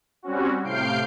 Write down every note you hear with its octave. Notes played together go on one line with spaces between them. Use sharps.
G3 C4 C#4 F#4
A2 C3 F5 G6 C7 D7